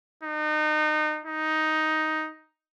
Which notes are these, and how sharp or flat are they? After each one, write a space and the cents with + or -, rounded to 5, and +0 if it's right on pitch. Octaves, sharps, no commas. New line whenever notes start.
D#4 -30
D#4 +5